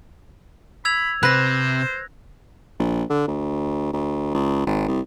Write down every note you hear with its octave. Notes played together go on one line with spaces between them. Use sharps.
B5 E6 G#6 F7
C3 B4 C5 F#6 A#6
A#1
D3
D2
D2
C#2
G#1
C2